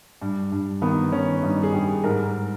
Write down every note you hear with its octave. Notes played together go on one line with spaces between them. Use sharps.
G2
G2
D#3 B3
D#3 C#4
G2 D#4
G#4
G2 G4
G#2 A#4